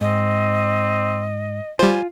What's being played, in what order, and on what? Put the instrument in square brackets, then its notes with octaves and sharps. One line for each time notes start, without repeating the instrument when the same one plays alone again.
[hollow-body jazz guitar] G#2 [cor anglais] C4 [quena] D#5
[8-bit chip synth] G3 C5 [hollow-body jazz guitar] F4 [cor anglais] G#5